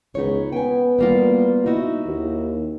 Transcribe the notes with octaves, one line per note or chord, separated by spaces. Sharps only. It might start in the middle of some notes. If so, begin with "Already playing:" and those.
C#2 B3 D#4 C#5
B3 G5 G#5
G3 A#3 F4
D#4 E4 F#4
D#2